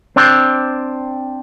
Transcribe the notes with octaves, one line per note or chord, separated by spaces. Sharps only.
C4 D4